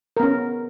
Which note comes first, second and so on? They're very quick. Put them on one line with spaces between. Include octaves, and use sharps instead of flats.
A#4 B3 C#4